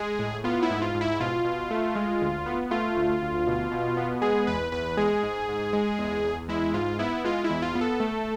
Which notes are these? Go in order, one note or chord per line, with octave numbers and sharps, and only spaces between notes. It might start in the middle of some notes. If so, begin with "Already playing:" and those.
Already playing: G#3 G#4
A2
B3 F4
E4
G#2
F4
G#2
E4
B2 F4
B2
A3
G#3
D2
B3
A3 F4
D2
D2
B2
B2
B3
G#3 G#4
E2 B4
E2 B4
G#3 G#4
G#2
G#2
G#3
E2
E2
G#3 E4
G#2 F4
B3 E4
G#3 F4
E4
E2
F4
B3
A4
A3